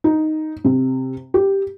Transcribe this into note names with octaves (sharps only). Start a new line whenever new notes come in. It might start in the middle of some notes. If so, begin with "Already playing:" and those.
D#4
C3
G4